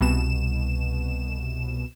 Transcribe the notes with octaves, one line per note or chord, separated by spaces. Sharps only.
C2 B2 E7